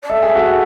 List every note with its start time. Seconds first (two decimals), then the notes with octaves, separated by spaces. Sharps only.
0.03 D5
0.09 A4 E5
0.23 G#4
0.35 F#4 A4